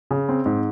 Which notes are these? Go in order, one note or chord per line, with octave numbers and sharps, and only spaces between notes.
C#3
C4
G#2